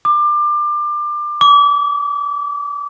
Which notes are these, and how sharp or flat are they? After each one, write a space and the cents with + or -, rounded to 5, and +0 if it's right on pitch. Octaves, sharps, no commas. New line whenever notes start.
D6 +25
D6 -30